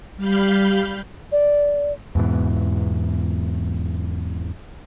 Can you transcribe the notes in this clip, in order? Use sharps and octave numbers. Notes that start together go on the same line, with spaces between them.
G3 F5 B5 G6
D5
E2 G#2 B2 E3